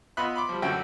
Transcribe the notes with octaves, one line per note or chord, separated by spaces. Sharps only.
B3 F4 D#5 E5 B5 F#6
B5 C6 D6
F3 G3
A1 F#2 D3 F#4 E5 G5